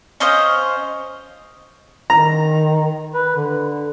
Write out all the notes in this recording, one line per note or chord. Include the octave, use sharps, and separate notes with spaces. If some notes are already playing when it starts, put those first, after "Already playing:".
C#4 C5 D#5 F5
D#3 A#5
B4
D3